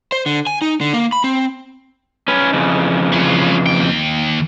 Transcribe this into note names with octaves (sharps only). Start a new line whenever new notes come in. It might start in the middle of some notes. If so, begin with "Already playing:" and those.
C5
D3
G#5
D#4
D3
A#3
B5
C4
C#4 B4
F2 C#3 E3
C#4 F4
D#2 G5